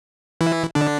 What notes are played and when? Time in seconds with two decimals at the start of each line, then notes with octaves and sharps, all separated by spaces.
0.41 E3 E4
0.75 D3 D4